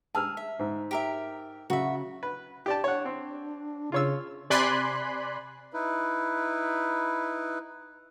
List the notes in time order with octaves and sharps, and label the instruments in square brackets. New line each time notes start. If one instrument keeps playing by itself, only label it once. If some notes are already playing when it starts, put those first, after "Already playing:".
[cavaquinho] G#4 [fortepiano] A5 E6 F6
[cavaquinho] E5
[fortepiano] G#2
[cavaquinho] G4 A#4 E5
[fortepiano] C#3 F#3 [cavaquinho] F#4 E5
[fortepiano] B4
G4 D5 A5
[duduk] D4 [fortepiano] C#5 F#5
[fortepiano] C4
[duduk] C#3 [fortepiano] F4 C#5 E6
[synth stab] C3 D5 G#5 B5 C6 F#6
[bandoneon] D#4 E4 B4